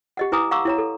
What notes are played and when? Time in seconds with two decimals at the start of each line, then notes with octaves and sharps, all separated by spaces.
0.17 G4 D#5 F#5
0.32 E4 B4 G#5 A#5 D6 D#6
0.51 F5 F#5 A#5 C#6 D6 E6
0.65 E4 C#5 A#5
0.78 A4